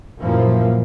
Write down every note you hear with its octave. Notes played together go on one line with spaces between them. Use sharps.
F#2 A#2 E3 F3 A#3